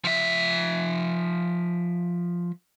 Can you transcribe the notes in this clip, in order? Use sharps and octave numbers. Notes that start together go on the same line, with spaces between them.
F3 E5